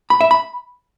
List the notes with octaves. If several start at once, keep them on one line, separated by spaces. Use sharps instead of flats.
B5
E5
B5